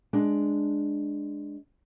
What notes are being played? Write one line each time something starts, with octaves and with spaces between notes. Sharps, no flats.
G#3 D4